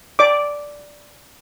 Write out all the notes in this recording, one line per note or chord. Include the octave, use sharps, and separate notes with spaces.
D5 D6